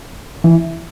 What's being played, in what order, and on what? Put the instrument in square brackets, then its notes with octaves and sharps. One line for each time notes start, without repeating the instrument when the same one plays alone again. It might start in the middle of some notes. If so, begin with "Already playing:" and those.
[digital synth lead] E3